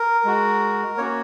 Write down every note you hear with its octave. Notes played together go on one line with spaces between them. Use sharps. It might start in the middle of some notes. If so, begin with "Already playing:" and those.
Already playing: A#4
G#3 F#4
A#3 C#4 F#4 C#5